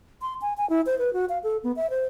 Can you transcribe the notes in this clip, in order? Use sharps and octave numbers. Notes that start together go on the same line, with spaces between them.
C6
G#5
G#5
E4
C5
B4
F#4
F5
A4
B3
E5
C5